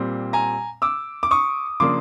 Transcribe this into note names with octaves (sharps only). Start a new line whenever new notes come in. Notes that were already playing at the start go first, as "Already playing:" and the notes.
Already playing: A#2 G3 C4
G#5 A#5
D6 E6
D6
C#6 D#6
C#3 F3 A#3 D4 C6 D6